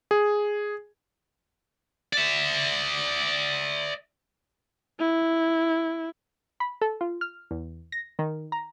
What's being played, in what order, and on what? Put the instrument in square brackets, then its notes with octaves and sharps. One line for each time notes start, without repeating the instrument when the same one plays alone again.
[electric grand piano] G#4
[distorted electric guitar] D5 E5
[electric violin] E4
[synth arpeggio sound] B5
A4
F4
F6
E2
A#6
D#3
A#5